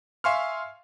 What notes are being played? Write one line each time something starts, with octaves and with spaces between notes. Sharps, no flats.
E5 F5 G#5 C6 C#6 F6